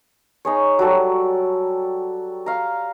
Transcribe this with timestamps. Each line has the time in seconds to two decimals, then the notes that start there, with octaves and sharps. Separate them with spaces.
0.45 D#4 G#4 C#5
0.79 F#3 G3 A4 D5
2.46 F5 A#5